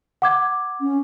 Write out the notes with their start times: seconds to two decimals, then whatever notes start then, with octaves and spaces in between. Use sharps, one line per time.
0.22 F#5 D6 G#6
0.81 C#4